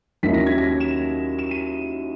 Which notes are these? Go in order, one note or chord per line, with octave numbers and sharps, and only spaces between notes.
D#2 D#3 F#3 C#4 E4 B6
A#6
G#6
A#6
E7
E7
D#7